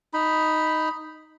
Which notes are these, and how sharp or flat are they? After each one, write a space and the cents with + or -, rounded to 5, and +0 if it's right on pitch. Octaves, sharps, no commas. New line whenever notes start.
D#4 +0 B5 +0